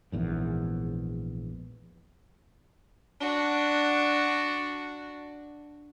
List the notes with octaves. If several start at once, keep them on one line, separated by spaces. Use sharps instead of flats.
A#1 E2 G#2
D4 F#4